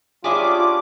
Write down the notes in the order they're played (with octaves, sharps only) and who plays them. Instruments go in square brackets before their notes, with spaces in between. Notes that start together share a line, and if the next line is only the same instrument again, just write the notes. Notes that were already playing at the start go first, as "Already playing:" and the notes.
[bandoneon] G3 C#4 D4 [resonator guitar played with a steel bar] E4 G#4 [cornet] F4 [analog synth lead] D6